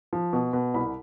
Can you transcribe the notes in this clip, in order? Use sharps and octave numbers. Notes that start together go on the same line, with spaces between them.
F3
B2
B2
C2 B5